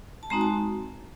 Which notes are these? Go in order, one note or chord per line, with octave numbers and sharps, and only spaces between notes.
A5
G#3 C4 D#4 F#4 A#5
A5